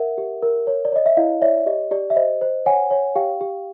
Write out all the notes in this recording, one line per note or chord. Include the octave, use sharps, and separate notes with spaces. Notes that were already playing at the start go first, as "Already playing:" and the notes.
Already playing: A#4 E5 F#5
G4
A#4
C#5
D5
C#5 D#5
E5
E4 D#5 F5
C#5 D5 E5
G4 D#5
G4 D5
E5
C5 D#5
C5
C#5 F#5 G#5
C#5
G4 F5 G5
G4